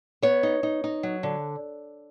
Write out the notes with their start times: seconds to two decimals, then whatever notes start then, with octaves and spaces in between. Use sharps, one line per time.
0.22 B3 C#5
0.43 D#4
0.63 D#4
0.84 D#4
1.03 F#3
1.23 D3